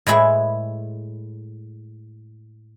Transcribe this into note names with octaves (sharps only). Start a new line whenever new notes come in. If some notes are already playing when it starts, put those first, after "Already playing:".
A2 G#3 E4 G#4 B4